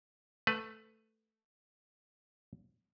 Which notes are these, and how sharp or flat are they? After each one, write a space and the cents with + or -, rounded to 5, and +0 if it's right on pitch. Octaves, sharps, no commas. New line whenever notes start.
A3 +0 B4 +15